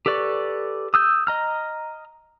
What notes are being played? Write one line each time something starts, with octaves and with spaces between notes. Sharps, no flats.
G4 A4 B4 D5 C#6
D#6 E6 G6
D#5 A#5 F6